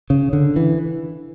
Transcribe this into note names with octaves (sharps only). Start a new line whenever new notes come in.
C#3
D3
E3